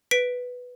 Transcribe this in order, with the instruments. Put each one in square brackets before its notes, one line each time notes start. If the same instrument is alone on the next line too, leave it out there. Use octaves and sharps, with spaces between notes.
[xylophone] B4 B6 D7